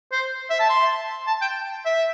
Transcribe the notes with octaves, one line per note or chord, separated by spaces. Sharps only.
C5
E5
A5
C6
A5
G5
E5